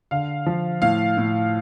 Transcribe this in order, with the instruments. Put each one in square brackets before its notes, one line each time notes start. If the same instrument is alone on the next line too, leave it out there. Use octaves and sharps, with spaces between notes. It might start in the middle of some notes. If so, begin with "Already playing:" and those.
[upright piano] D3 F5
F3
A2 F5
A2